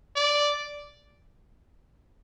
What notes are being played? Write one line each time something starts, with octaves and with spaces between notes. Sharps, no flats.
D5